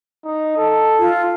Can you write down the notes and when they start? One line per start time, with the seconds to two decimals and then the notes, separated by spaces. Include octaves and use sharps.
0.25 D#4
0.57 A4
0.99 F4